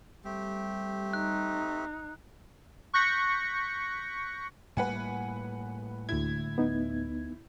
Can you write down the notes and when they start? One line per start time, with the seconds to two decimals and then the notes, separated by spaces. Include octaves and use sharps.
0.25 G3 A3 C4 G4
1.13 D#4 F#6
2.93 C#6 F#6 G6 A#6 B6 C#7
4.77 A2 G3 A#3 B4 F#5 G#5
6.09 D2 E4 G#6
6.58 B3 D#4